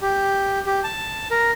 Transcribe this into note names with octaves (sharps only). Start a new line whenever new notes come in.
G4
G4
A5
A#4